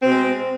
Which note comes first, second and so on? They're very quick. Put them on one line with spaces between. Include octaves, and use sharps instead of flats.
C4 B2 G#3